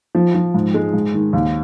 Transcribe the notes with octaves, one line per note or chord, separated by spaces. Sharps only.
F3
F3
G#2
G#3
G#2
D#3
D#2